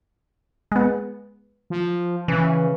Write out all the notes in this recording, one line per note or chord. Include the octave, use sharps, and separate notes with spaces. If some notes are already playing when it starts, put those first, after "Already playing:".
G#3 B3
F3
C#3 E3